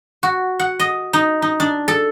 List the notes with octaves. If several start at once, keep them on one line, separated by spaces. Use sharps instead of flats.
F#4
F#5
D#5
D#4
D#4
D4
A4